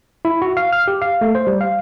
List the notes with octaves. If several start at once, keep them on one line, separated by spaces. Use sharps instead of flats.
E4
F#4
F5
F6
G4
F5
A3
C5
G3
F5